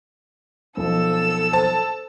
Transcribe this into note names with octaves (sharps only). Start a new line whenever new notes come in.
B1 F3 A4 E6
C5 A5